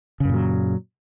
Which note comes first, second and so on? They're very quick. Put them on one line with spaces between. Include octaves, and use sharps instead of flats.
C#3 F#2 A#2 F#3